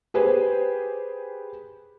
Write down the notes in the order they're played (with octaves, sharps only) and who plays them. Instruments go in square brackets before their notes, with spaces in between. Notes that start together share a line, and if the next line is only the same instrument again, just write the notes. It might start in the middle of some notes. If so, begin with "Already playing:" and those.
[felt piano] G4 G#4 B4 C5